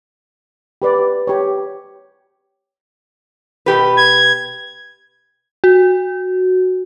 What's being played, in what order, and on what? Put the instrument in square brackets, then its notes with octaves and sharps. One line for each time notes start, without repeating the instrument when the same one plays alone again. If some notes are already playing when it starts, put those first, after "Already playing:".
[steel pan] G4 B4 D5
G4 C#5
[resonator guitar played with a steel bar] B2 G4 B4
[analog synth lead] G#6
[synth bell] F#4